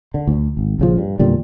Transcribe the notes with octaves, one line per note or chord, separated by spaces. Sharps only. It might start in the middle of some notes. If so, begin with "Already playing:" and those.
D3
D2
G#1
A#1 C#3 F3
G2
E2 A#2 D3 G3